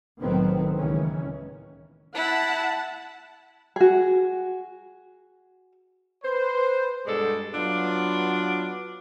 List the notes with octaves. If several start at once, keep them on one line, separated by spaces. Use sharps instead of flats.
C2 A2 D#3 F#3 B3 C4
C#2 A#2 D#3 E3 G#3 C#4
E4 F#5 A5
F#4 G#4
B4 C5
G2 B2 G#3 A4 D5
F#3 B3 D4 F4